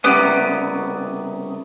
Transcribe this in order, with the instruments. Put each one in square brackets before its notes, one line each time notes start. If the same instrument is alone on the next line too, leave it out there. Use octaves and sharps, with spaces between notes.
[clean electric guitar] C2 C#3 [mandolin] B3 D#4 G4